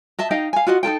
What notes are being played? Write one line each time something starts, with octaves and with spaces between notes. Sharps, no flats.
D#5 E5 A5
D#4 D#5 F5 G5
F5 G#5
F4 F#4 D#5 F#5
D#4 F4 A4 G5